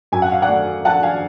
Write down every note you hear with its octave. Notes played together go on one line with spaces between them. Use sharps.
F#2 G#5
F#5
F5
D5 F#5
A3
F3 F#5 A5
F5 G#5